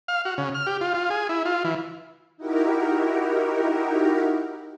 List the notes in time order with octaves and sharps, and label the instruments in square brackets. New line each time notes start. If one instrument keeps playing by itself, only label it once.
[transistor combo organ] F5
F#4
C#3
F6
G4
F4
F4
G#4
E4
F4
E3
[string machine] D#4 E4 F#4 G4 A#4